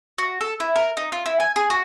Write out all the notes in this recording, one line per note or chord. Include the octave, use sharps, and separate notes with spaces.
F#4
A4
E4
A#4
D#4
F4
E4
G#5
G#4
F#4